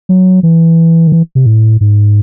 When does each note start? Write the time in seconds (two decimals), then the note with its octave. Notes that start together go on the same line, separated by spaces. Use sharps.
0.09 F#3
0.43 E3
1.07 D#3
1.12 E3
1.35 C3
1.46 A2
1.81 G#2